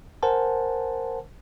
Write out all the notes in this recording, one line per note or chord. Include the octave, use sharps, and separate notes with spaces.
A#4 C5 F#5 G#5 A5